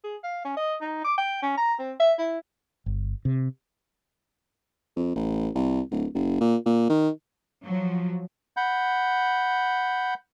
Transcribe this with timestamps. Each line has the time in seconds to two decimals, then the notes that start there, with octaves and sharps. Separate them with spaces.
0.04 G#4
0.23 F5
0.45 C#4
0.57 D#5
0.81 D#4
1.04 D6
1.18 G5
1.42 C#4
1.57 A#5
1.79 C4
2.00 E5
2.18 E4
2.86 G1
3.25 C3
4.96 F2
5.15 A1
5.55 C2
5.91 D1
6.14 F#1
6.40 A#2
6.65 A#2
6.89 D#3
7.64 F3 F#3
8.57 F#5 B5 G6